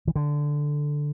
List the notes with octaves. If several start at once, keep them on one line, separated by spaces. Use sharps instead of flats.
E3
D3